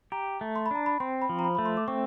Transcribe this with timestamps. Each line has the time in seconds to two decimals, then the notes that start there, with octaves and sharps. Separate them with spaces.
0.12 G4 A#5
0.41 A3
0.56 C6
0.66 B5
0.71 D4 A#5
0.86 B5
1.00 C4 C6
1.22 B5
1.29 F3
1.39 A#5
1.44 B5
1.55 A3 B5
1.66 C6
1.77 D6
1.88 C4 C#6